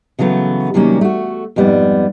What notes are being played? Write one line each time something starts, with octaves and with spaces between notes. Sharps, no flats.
C#3 E3 F#3 A3 B3
C3 D#3 F#3 G3 A#3 C#4
A3 F#4
F2 G#2 G3 B3